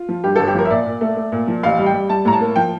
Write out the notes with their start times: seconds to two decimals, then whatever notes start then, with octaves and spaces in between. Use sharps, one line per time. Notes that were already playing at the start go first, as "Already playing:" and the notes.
Already playing: F4
0.09 F3
0.24 G2 G4
0.36 G1 A4
0.47 G4
0.55 F3 A#4
0.65 E5
0.70 A#2 D5
0.86 A#2
1.01 A3
1.17 A3
1.32 A#2
1.48 F3
1.63 A1 F5
1.79 G3
1.86 G5
1.94 G3
2.10 G3 A5
2.25 A2 A#5
2.33 A5
2.40 A#3
2.56 F3 G5